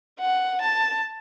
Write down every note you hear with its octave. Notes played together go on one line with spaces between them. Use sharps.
F#5
A5